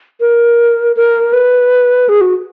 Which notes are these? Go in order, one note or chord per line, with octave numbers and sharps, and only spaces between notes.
A#4
A#4
B4
G#4
F#4